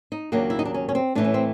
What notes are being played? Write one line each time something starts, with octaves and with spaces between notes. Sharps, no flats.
D#4
D#2 C#3 F#3 A#3 D4
E4
D#4
D4
C#4
C#4
C4
A2 E3 A3 D4
C#4
C4